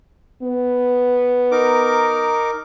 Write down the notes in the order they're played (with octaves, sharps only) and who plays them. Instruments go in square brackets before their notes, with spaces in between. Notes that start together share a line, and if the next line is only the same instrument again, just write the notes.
[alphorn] B3
[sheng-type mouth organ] D#4 A#4 D6